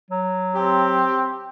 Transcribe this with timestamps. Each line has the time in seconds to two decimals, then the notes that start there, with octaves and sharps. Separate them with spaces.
0.11 F#3
0.55 C4 G4